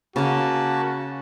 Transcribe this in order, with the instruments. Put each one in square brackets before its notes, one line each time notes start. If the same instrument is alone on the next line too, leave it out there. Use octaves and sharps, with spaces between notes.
[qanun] C#3 C#4 [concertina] A#3 A5 [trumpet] F#4